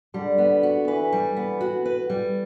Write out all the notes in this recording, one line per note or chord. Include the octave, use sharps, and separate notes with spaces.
D3 G3
B3
F#4
E3 B4
G3
B3
F#4
B4
G3